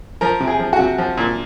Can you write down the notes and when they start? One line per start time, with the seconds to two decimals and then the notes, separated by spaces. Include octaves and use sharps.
0.21 F3 A#4
0.40 C3
0.47 G#4
0.60 F3
0.73 F#4
0.79 C3
0.98 F3
1.17 A#2